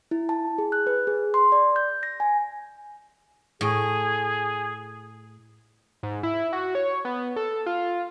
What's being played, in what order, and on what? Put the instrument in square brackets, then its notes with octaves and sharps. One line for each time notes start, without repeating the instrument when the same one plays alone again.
[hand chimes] E4
A5
G#4
F#6
B4
G#4
C6
D5
G6
A#6
G#5
[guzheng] A2 [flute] G#4
[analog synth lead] G#2
E4
F#4
C#5
B3
A4
F4